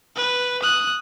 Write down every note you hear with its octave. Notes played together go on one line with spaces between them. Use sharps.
B4
D#6 F#6